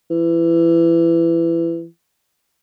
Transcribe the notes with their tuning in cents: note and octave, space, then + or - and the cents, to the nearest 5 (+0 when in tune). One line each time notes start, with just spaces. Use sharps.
E3 +20